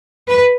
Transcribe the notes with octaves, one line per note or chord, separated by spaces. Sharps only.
B4